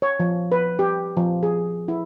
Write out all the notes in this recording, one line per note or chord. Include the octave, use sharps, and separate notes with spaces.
C#5
F3
B4
G4
F3
G#4
E4